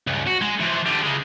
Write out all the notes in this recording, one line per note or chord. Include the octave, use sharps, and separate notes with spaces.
C#2 G2
F#4
G#3
E3 F3
D3 G3
C#3 G#3